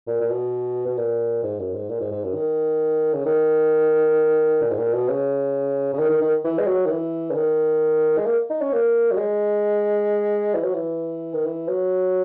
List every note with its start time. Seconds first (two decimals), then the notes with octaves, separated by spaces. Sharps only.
0.07 A#2
0.20 A#2
0.30 B2
0.86 B2
0.97 A#2
1.43 G#2
1.59 F#2
1.73 G#2
1.89 A#2
2.00 G#2
2.11 G#2
2.23 F#2
2.34 D#3
3.13 C#3
3.25 D#3
4.62 A#2
4.71 G#2
4.77 A#2
4.93 B2
5.08 C#3
5.93 C#3
5.98 D#3
6.10 D#3
6.21 D#3
6.44 E3
6.59 G#3
6.66 F#3
6.85 D#3
6.90 E3
7.30 C#3
7.35 D#3
8.17 G#3
8.26 A#3
8.50 D#4
8.61 C#4
8.72 A#3
9.11 F#3
9.17 G#3
10.54 E3
10.63 F#3
10.74 E3
11.33 D#3
11.45 E3
11.68 F#3